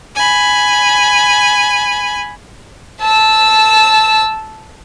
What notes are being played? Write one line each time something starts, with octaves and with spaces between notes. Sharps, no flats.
G#5 B5
A5 E6